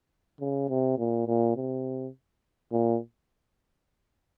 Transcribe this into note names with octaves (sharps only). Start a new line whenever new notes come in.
C#3
C3
A#2
A#2
C3
A#2